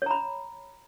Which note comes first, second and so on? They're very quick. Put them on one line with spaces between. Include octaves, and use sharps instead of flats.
C#5 A#5 B5